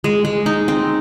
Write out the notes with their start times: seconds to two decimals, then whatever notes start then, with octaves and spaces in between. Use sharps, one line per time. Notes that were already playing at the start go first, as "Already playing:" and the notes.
0.04 G#3
0.25 G#3
0.46 D#4
0.68 C4